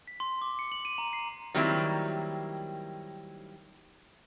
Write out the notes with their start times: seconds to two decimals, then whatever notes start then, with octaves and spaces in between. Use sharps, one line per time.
0.08 B6
0.20 C6
0.42 D6
0.59 C#7
0.72 F#7
0.85 D#7
0.98 A#5
1.13 C7
1.54 D#3 F#3 G3 A#3 C4 E4